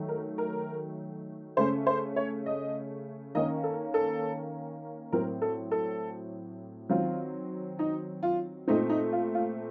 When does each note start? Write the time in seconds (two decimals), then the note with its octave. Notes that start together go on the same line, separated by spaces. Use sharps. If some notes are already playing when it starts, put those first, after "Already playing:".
Already playing: D#3 F#3 A3
0.09 A#4
0.38 A#4
1.57 C#3 A3 C#4 C5
1.87 C5
2.16 C#5
2.46 D#5
3.35 D#3 A#3 C#4 D#5
3.64 A4
3.94 A4
5.12 A2 F#3 C4 A#4
5.42 A4
5.71 A4
6.90 D#3 F#3 C4 F4
7.79 D#4
8.23 F4
8.68 A#2 A3 C4 D#4
8.89 D#4
9.12 F4
9.35 F4